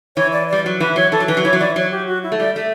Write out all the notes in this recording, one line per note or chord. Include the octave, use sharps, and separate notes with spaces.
E3 C#5
D5
G3 D5
F#3
E3 B4
F#3 C#5
E3 A4
F#3
E3 B4
F#3
E3 C#5
F#3
E3 D5
F#3 C#5
G4
F#4
E4
A3
G3 D5
A3 E5